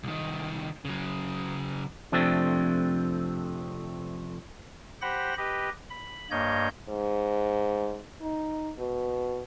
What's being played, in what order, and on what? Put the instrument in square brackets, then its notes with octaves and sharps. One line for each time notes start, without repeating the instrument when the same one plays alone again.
[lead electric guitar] C2 D#3
C#3 F#3
[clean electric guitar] F2 C3 F3 A3 C4 D4
[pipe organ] G4 C5 F#5 B5 A#6
G4 B4 D#5
B5
G2 A#3 C#5 D#5 G6
[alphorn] G#2
D#4
B2